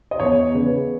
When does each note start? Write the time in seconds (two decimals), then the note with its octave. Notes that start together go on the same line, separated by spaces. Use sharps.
0.11 D#5
0.20 E2 C#5
0.54 C#3 B4